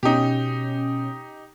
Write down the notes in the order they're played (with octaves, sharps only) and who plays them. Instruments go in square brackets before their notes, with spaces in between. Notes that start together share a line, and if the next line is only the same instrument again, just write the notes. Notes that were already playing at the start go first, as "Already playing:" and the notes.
[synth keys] B2 C#4 [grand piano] D#4 G4